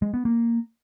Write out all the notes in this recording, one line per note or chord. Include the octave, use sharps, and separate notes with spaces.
G#3
B3
A#3